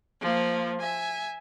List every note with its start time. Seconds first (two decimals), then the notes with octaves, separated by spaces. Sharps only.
0.21 F3 A#3
0.80 E5 G#5